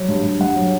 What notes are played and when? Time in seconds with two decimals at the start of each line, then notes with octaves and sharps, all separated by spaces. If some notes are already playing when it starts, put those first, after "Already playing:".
Already playing: F#3
0.09 G2
0.23 G2
0.39 G2 F#5
0.56 F#3